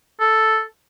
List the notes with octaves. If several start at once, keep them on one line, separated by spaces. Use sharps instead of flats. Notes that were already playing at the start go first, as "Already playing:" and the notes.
A4